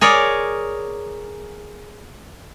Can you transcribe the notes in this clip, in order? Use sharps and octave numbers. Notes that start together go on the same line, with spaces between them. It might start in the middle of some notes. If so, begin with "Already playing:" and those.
G#4 A#4 C#5 D5